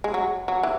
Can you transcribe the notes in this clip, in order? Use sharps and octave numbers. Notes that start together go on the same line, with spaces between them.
G#3
F#3
F#3
E3